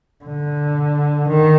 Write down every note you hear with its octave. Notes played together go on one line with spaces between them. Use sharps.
D3
D#3